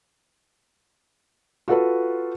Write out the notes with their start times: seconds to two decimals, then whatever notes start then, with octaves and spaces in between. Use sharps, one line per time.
1.68 F4 F#4 A4 B4